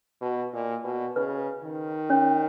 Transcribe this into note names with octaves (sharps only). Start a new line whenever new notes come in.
B2
A#2
B2
C#3 B4
D#3
C#4 C#5